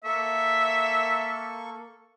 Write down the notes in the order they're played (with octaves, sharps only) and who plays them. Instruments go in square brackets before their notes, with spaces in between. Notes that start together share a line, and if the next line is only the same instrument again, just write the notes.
[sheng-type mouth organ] A#3 A4 C#6 [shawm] E5